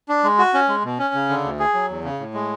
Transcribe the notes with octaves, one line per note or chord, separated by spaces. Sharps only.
D4
G#3
F#4
C#4
G#3
B2
C#4
C#3
D3
D2
G#4
F#3
E2
C#3
A2
G#3